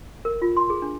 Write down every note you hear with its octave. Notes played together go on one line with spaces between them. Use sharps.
A#4
F4
C6
G#4
D4